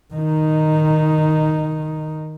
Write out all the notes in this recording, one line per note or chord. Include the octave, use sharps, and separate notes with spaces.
D#3 D#4